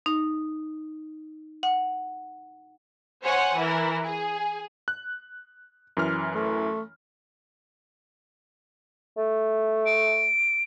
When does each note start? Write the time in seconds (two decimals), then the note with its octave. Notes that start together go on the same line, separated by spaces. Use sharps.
0.06 D#4
1.63 F#5
3.25 C5 C#5 F#5 G#5
3.57 E3 E4 A#4
4.03 G#4
4.88 F#6
5.97 F#2 E3 F6
6.35 A3
9.17 A3
9.86 D7